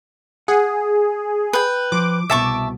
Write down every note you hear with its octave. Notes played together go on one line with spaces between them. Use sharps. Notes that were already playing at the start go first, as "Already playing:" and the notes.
G#4 F#5
B4 G5
F3 D6
C2 B2 E5 A5 C#6